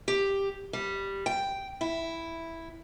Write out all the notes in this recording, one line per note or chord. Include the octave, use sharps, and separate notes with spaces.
G4
G3
G5
E4